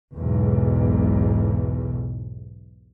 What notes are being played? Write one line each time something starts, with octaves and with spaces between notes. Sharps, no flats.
B1 E2 G#2